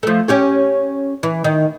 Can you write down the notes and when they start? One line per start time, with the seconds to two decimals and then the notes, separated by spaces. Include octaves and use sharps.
0.03 F3 A3
0.28 C#4 G4 C#5
1.23 E3
1.44 D#3